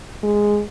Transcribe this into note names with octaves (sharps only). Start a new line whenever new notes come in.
G#3